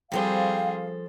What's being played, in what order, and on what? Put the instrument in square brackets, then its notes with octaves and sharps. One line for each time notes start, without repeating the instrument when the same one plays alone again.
[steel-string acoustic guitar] F3 A4 C5 [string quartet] G3 C4 G#4 [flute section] F5 [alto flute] G5